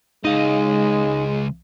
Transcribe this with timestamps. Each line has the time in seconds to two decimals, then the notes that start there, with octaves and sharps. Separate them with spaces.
0.25 C#2 G#3 D#4 D#5 F5